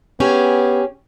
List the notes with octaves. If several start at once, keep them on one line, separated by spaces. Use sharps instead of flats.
B3 C#4 G4 G#4